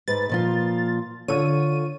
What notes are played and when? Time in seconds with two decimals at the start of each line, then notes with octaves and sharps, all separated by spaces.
0.08 G#2 B4 A6
0.29 A#2 F3 F4
1.28 D3 F4 C#5 D#7